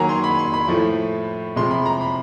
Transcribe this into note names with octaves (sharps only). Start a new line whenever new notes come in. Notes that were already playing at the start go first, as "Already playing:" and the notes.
Already playing: D#3 F#3 A#3 G#5 A#5
C6
B5
C6
B5
A2 F3 A3
C3 F3 G#3 C6
B5
A#5
B5